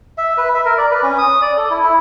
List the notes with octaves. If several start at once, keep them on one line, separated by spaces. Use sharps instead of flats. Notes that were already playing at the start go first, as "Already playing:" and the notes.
E5
B4
E5
A#4
D5
B4
C#4
D#6
D5
A4
E4
E4